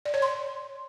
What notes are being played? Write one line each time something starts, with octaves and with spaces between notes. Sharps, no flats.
D5
C#5
C6